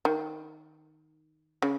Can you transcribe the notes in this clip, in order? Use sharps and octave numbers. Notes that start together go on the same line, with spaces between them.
D#3
C#3